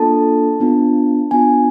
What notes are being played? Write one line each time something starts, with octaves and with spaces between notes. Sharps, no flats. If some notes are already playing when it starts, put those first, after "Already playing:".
Already playing: A#3 D4 F4 A4 A5
B3 D4 F4
B3 D4 F4 G#5